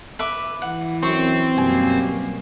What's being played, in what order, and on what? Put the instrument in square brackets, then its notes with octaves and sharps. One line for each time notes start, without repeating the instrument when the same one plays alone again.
[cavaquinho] B4 E5 D6
[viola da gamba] E3 [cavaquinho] F#5
[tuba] F#2 [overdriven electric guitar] C4 [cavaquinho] C#6
[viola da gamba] F#2 B2 A#3 [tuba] G3 [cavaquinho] G#5